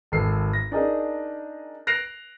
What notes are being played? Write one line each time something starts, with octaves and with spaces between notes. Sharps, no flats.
G#1 A4 C7
A#6
D4 D#4 G#4 A#4 D#5
F#6 A#6 C7 D7 F7